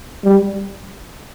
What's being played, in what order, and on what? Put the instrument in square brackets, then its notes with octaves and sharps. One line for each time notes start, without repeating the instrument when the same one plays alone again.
[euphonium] G3